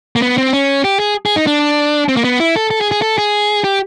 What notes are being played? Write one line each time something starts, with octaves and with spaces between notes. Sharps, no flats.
A#3
B3
C4
C#4
G4
G#4
G#4
D#4
D4
C4
A#3
B3
E4
A4
A4
G#4
G#4
A4
G#4
G4